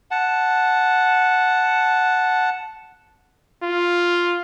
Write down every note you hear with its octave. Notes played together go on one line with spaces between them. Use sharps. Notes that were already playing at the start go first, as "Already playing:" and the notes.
F#5 A5
F4